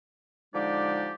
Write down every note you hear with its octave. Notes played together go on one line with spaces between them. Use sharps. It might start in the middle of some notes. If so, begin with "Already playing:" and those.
D3 F3 G#3 D#4 G4 D5